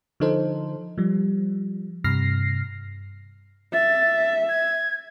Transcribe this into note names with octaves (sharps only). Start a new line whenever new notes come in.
D3 F3 D#4 A4 C5
F3 G3
G2 C3 F6 A#6 C7
E5 A6
G#6